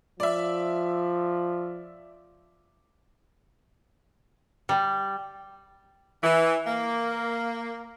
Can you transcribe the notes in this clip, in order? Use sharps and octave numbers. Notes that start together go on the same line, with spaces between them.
F3 D5 E5
G3
E3
A#3